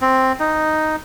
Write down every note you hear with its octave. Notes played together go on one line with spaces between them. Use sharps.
C4
D#4